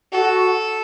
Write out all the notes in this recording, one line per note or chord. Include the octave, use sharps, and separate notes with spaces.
F#4 A4